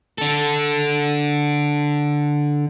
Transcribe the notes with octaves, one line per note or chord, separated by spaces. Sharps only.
D3 A4